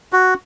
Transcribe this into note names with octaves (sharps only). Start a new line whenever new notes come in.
F#4